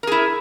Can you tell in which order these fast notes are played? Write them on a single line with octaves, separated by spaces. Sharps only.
A#4 G#4 E4